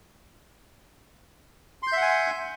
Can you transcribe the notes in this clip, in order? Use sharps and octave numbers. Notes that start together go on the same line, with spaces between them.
E5 F#5 G#5 C6 G6